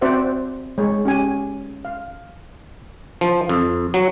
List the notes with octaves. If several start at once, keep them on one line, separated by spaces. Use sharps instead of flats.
C4 F#4 C5 D5 E5 F#5
G#3 C#5
C#4 G4 G#5
F5
F3
F2
F#3